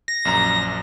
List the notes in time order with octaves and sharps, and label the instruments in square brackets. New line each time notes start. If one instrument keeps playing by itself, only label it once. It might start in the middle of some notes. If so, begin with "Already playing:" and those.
[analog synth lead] A#6
[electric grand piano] A#1 F#2 A#5